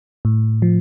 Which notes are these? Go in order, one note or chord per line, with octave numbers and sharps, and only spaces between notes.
A2
F3